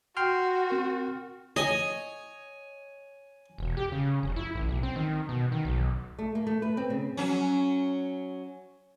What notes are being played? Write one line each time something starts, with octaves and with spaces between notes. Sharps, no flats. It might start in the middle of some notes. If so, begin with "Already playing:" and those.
F#4 G5 C6 F6
C4 A#4
C#5 D#5 G#5
E1
G4
C#3
F1
E4
A1
B1
C4
D#3
B2
D#3
B1
A3
A#3
A3
B4
C4
C#3
F#3 C#4